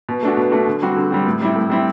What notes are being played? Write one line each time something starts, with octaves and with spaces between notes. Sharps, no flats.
B2
A3 D4 F#4
B2
A3 D4 F#4
D3
G3 C4 F#4
D3
G3 C4 F#4
A2
G3 C4 E4
A2
G3 C4 E4